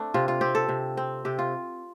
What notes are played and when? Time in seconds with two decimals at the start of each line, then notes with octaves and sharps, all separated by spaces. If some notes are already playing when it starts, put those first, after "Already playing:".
Already playing: A3 C4 D4
0.14 C3 F4
0.28 F4
0.41 C4 G4
0.55 A4
0.69 C3
0.97 C4
1.25 C3 G4
1.39 F4